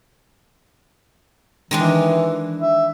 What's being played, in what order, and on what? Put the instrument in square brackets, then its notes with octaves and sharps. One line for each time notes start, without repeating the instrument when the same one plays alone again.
[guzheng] D#3 G#3 D4 [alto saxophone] E3
[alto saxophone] E5